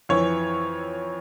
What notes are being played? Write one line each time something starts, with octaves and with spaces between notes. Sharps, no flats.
F2 E3 C#5